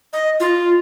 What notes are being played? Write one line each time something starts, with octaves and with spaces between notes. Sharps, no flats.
D#5
F4